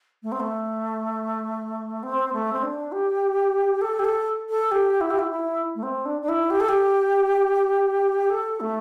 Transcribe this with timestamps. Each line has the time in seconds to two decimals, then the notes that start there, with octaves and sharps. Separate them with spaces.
0.23 A3
0.32 C4
0.40 A3
2.03 C4
2.33 A3
2.53 C4
2.63 D4
2.92 G4
3.81 A4
3.99 G4
4.04 A4
4.50 A4
4.71 G4
5.01 E4
5.11 G4
5.19 E4
5.31 E4
5.75 A3
5.83 C4
6.05 D4
6.22 D4
6.29 E4
6.50 G4
6.60 A4
6.68 G4
8.30 A4
8.60 A3